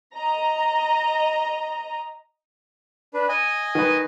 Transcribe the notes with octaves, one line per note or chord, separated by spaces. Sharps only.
D#5 A#5
D4 B4
D#5 G#5
D#3 B4